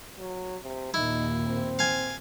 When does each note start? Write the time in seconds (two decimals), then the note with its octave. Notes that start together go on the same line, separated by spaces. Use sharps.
0.18 F#3
0.63 C3
0.94 D#2 A#2 A#3 D#4 E4
1.46 C4
1.79 F5 G#5